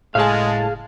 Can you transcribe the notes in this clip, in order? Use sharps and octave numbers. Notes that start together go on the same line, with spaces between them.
F#1 A2 G#3 G#4 F5 A5